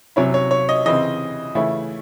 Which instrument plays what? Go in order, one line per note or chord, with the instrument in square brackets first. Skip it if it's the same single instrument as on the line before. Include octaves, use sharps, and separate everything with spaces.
[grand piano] C3 F#3 C#4 E4 C#5
C#5
C#5
D#5
C#3 E3 C4 D#5
C#3 E3 A3 C#4 E4